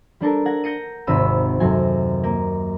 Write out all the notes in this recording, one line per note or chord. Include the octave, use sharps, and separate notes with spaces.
G3 D4 A4 A#4
F#5 G#6 A#6
G6 A#6 C#7 D#7
G#1 D#2 C3 B5 E6 D#7
F#2 C3 F#3 A4 G#5
A#3